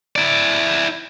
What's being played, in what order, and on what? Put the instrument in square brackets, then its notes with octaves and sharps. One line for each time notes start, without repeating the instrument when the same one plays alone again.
[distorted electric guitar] E4 D5